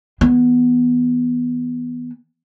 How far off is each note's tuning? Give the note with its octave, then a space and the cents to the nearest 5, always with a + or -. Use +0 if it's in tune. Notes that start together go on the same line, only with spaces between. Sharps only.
E3 -30 B3 +0